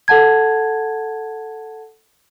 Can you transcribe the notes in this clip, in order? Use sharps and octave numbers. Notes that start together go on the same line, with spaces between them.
A4 F#5 A5 G#6